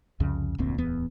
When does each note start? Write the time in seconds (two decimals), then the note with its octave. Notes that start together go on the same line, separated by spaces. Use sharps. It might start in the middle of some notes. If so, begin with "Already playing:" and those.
0.20 C2 F2 C#3
0.58 F1 D2 A#2 C4
0.78 D1 E2 B3